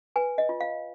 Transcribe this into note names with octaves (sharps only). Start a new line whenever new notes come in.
B4 G#5
D#5
F4
F5